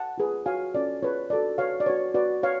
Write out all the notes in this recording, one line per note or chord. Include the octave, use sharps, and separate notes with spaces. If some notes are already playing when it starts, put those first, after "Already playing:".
Already playing: F#5 A5
F4 G#4 B4
F#4 C#5 F5 G#5
C#4 F4 A4 C#5 D5
F4 G#4 B4 C#5
F#4 A4 C#5 D5
F#4 B4 C#5 F5
D5
F#4 B4 C#5
F#4 B4 D5
B4 C#5 F5